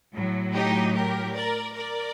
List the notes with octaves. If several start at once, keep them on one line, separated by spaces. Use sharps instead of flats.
A2 F#3
D#4 G4
G4 A#4
A#4 D5
A#4 D5